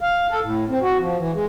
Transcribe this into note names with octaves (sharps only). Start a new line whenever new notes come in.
F5
A4
A2
C4
F#4
F3
E3
G#3